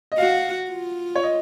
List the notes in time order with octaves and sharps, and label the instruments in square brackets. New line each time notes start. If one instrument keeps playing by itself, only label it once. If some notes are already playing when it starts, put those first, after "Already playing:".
[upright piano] D#5
[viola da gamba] F#4 [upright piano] F5
[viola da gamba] F4
[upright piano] C#5
D#5